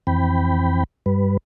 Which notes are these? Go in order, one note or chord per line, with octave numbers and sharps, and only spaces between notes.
F2 E3 C4 G5 B5
G2 G3 B4